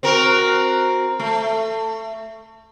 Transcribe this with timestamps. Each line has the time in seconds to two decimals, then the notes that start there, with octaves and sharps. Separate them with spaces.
0.03 C4 F#4 A#4
1.19 A3